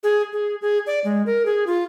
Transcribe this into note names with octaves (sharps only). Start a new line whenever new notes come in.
G#4
G#4
G#4
D5
G#3
A#4
G#4
F4